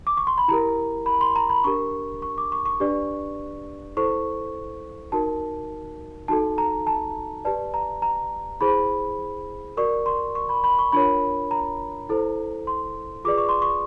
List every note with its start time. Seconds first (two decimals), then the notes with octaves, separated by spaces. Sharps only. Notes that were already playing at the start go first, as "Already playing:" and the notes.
0.07 D6
0.17 C#6
0.27 C6
0.38 B5
0.48 E4 G4 A#4 A#5
1.06 B5
1.21 C6
1.36 A#5
1.49 B5
1.64 D4 G4 A#4 C#6
2.22 C#6
2.38 D6
2.52 C#6
2.66 C#6
2.80 D4 G4 B4 D5
3.97 E4 A4 C5 C#6
5.12 D#4 F#4 A#4 A5
6.28 D#4 F#4 A4 A5
6.58 A#5
6.87 A5
7.45 G4 B4 D5 A5
7.74 A#5
8.02 A#5
8.61 E4 G#4 C5 B5
9.77 F#4 A#4 D5 C#6
10.06 C6
10.35 C#6
10.49 B5
10.64 B5
10.79 C#6
10.92 D4 F4 A#4 C#5 B5
11.51 A#5
12.09 E4 A4 C5
12.67 C6
13.25 F4 G#4 B4 D5 D6
13.38 C#6
13.49 C6
13.62 C#6